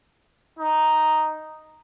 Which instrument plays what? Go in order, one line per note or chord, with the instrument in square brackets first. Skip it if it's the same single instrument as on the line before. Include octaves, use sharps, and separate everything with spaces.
[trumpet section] D#4